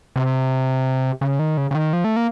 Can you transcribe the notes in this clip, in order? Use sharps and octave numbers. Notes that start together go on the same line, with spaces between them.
C3
C#3
D#3
C#3
C#3
D#3
F3
A3
A#3